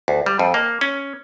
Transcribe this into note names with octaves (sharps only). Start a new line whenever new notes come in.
D2
G3
F2
A#3
C#4